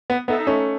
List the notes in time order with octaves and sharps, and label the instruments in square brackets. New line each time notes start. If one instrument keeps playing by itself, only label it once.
[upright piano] B3
[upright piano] B3 [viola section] D#4 A4 E5
[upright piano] A3 C#4